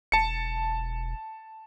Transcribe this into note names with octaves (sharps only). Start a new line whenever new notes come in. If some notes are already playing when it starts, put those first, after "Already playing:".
E1 A5 C#7